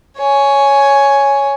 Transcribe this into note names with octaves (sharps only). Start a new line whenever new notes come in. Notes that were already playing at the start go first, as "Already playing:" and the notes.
C#5 G#5